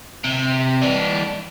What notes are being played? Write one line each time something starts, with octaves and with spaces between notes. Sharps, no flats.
C3
E3 D4